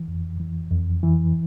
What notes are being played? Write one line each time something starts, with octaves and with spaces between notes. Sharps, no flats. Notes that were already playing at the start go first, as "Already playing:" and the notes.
Already playing: E3
F2
E3
F2
E3